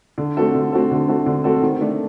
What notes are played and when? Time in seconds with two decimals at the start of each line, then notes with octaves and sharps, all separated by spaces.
0.18 D3
0.37 A3 C4 F#4 A4
0.55 D3
0.72 A3 C4 F#4 A4
0.91 D3
1.09 A3 C4 F#4 A4
1.26 D3
1.44 A3 C4 F#4 A4
1.62 D#3
1.81 A3 D4